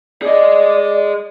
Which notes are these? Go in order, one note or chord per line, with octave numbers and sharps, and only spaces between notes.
G#4 D5 D#5